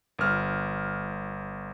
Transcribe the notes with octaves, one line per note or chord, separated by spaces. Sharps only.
G1 F6